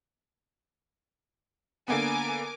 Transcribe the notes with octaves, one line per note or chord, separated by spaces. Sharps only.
D3 A#3 B3 A#4 G#5 D6